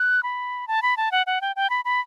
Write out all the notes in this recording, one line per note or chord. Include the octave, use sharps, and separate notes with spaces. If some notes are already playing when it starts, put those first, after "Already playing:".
Already playing: F#6
B5
A5
B5
A5
F#5
F#5
G5
G5
B5
B5